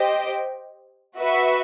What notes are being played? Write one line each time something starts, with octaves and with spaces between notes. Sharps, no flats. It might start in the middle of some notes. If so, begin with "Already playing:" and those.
Already playing: G4 C5 D#5 G5
F#4 B4 E5